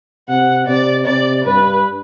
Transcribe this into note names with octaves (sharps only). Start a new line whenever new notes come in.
C3 F#5
C3 D5
C3 D5
G2 B4